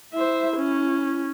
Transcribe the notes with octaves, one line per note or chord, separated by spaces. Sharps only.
E4 C5 E5
C#4